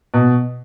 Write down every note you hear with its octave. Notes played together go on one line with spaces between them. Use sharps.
B2